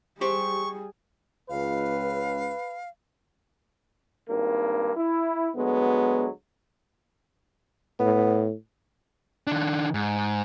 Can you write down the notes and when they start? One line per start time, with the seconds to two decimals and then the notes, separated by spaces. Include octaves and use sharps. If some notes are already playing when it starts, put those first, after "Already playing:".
0.21 G3 G4 G#4 C5 C#6
1.49 C#2 B4 F5
4.29 G#1 G2 A#3
4.97 E4
5.56 D2 F#3 G#3 B3
7.99 A2 B3
9.47 D#3 D4
9.94 G#2